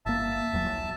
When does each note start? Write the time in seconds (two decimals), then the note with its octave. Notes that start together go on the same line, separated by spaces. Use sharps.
0.06 G1 A#3 E5 A5
0.53 D#1 E2 F#3
0.68 B1